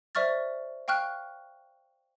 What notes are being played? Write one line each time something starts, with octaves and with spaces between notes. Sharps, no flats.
C5 D5 E5 C#6 F6 A6
F5 G5 C#6 F6 F#6